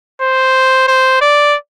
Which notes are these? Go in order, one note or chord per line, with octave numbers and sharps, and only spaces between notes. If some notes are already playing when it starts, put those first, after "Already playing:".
C5
C5
D5